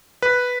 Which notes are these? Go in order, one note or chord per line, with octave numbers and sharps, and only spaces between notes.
B4